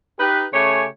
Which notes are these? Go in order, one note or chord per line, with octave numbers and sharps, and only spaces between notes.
D#4 G4 B4
C#3 A3 G4 C#5 G#5